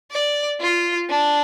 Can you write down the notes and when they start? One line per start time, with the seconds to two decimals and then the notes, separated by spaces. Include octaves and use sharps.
0.11 D5
0.60 F4
1.10 D4